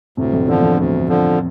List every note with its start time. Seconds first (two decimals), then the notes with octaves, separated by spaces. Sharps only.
0.17 D2 A2 C3
0.33 F2 A2
0.48 E2 G2 D3 F3
0.62 F2
0.78 D2
1.09 D3 F3